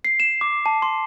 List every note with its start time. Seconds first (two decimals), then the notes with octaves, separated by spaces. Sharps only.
0.05 C7
0.20 E7
0.41 D6
0.66 A5
0.82 C6